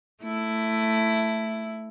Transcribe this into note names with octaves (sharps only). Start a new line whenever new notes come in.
A3 E4